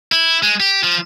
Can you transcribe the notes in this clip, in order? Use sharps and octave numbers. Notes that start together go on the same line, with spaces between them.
E4
G#3
G4
F3